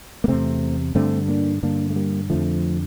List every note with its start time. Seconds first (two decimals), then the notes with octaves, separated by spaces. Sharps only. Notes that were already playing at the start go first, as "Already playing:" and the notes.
0.24 A#3
0.28 E2 C3 A3 C4
0.95 G2 D3 A3 C4
1.28 A#3 D4
1.63 G2 D3 A#3 D4
1.90 A3
1.96 G3 A#3
2.30 F2 D3 F3 A3